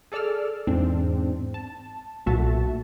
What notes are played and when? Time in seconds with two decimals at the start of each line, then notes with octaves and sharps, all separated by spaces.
0.12 G#4 A4 D5 E6 F6
0.67 E2 G#2 C4 D4
1.54 A5
2.26 B1 A#2 A3 F#4 E5 A5